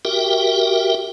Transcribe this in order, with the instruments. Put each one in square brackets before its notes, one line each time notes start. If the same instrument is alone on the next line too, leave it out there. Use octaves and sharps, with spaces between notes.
[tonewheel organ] F#4 G4 A#4 E5 G5